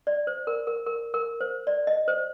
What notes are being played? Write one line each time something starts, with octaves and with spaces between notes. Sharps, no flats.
D5
C5
A#4
A#4
A#4
A#4
C5
D5
D#5
C5